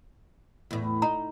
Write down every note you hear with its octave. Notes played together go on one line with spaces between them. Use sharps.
E2 A2
D#4 A#5